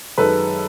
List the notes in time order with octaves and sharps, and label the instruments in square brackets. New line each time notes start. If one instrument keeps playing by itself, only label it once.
[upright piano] F#2 D#3 G#3 A4 B4